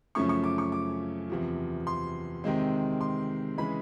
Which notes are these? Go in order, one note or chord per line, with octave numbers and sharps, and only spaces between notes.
F#2 C#3 F3 A3 C#4 C#6
C#6
D6
C#6
D6
E2 C3 F3
C6
C3 D#3 G#3 C4
C6
C#3 E3 G#3 B5